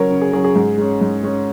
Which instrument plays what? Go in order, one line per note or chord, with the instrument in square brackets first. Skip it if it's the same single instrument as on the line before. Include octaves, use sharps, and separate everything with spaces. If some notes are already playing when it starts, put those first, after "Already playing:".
Already playing: [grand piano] C#3 F#3 C#4 A#4 C#5
C#3
G#4
F#3 C#4 G#4
G#4
G#2
G#3 C#4
G#2
G#3 C#4